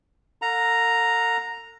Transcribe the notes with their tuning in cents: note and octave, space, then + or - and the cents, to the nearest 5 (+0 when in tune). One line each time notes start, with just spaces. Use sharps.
A4 +40 F#5 -45 A#5 +0